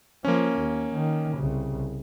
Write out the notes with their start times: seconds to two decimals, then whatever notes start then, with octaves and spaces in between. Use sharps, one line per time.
0.25 F3 A#3 C#4
0.57 D#2
0.94 D#3
1.36 C2 C#3